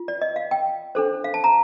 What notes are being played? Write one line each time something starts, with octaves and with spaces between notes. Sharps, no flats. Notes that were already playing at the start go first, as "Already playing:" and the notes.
Already playing: F4
D5
D#5
F5
G5
D4 A4 C5
F5
A5
A#5